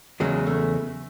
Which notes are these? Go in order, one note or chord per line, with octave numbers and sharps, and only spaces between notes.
E2 C#3 F#3 G#3
A3